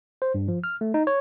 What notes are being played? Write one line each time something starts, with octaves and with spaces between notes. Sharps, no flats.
C5
G2
F3
F6
A3
D#4
C#5